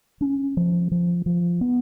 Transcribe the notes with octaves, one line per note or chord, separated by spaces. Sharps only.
C#4
F3
F3
F3
B3